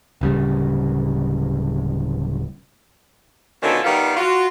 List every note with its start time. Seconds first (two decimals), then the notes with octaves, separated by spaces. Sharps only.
0.21 D1 C#3 G3
3.63 B2 D3 D#3 C#4 F4 A4
3.84 D#3 G3 B3 F4 F5
4.17 F4 F#4